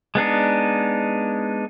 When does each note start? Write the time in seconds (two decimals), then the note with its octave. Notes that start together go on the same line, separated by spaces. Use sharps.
0.15 G#3 B3 D4 D#4